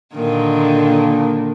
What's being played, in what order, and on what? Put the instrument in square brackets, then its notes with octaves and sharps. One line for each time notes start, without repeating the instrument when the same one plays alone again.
[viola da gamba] A#2 D3 D#3